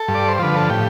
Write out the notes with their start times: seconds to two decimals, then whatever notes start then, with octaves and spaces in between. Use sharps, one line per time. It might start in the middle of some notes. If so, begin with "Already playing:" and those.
Already playing: A4
0.08 G2
0.15 D5
0.28 C5
0.39 D3 F3 B4
0.56 A4
0.70 A2 G4